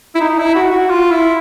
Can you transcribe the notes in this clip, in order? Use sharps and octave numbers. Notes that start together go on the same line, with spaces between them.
E4
D#4
E4
F#4
F#4
F4
E4